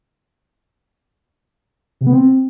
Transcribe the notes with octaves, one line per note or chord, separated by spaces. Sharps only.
C3
B3
C4